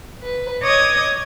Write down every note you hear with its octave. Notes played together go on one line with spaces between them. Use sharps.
B4
C#5 D#5 D6 D#6 G#6